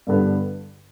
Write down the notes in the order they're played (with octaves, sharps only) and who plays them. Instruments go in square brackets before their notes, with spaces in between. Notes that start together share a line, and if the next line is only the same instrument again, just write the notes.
[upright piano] G2 D3 G3 B3